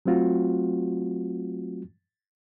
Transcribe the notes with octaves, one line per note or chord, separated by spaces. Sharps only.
F#3 A3 C4 F4 F#4